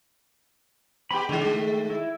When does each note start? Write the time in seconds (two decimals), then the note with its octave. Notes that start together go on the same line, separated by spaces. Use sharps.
1.11 B3 G4 B5
1.29 D3 D#3 G#3
1.46 A3
1.90 E4